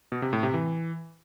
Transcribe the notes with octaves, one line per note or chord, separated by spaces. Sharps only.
B2
C3
A2
C3
E3